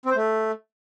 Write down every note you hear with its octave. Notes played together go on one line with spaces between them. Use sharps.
C4
C5
A3